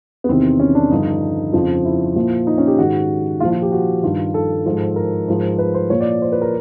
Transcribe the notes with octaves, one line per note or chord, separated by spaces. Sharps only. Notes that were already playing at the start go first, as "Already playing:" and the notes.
B3
E2 C3 D#3 C4
C#4
D4
G2 D3 F3 D#4
F2 C#3 F3
E4
A#2 F3
D#4
C#4
G4
G#2 D#3 F#4
A#2 F3 F4
F4
G4
F#4
G2 D#3 F4
A4
G#2 F3
A#4
G#2 F3
B4
C5
A#2 F3 C#5
D5
C5
B4
A#4